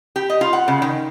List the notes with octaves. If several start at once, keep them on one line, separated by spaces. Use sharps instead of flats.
G4
D#5
F4
F#5
C#3
D#3